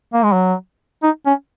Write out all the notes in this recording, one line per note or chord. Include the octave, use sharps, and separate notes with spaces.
A#3
G#3
F#3
D#4
C#4